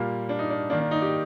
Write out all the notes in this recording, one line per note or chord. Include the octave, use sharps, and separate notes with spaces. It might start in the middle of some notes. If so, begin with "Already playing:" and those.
Already playing: A#2 G3 A#3 F4
D4
D#4
D4
D#3 A#3 D4
D4
D#4
G4